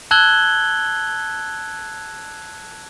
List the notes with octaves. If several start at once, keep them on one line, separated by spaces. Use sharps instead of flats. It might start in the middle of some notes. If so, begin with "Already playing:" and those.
A5 E6 F#6 G#6 F#7 G7